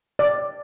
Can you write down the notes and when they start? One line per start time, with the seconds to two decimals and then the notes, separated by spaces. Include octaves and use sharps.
0.19 D5